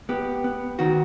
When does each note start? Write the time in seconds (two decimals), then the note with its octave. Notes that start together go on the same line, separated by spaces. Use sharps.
0.09 B3 G4
0.44 B3
0.79 D#3 F#4